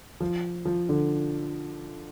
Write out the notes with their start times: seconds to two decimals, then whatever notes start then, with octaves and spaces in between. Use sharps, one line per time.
0.20 F3
0.65 F3
0.89 D3